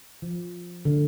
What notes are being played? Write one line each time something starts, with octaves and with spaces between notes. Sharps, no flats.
F3
D3